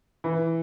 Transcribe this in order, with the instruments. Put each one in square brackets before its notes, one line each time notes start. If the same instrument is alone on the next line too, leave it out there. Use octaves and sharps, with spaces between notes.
[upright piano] E3